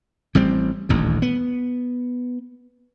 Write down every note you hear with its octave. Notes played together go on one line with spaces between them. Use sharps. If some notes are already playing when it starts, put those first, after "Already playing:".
A1 G3 C4
D#1 A1 D2
B3